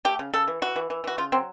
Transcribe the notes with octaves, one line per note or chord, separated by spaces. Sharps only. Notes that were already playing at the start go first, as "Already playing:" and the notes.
A3 G4
C#3
C#3 A4
E3
E3 F#4
E3
E3
E3 F#4
C#3 F4
F#3 C4